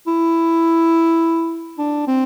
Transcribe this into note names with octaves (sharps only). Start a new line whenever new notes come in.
E4
D4
C4